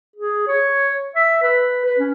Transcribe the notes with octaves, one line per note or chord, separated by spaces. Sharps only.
G#4
C#5
E5
B4
B4
C#4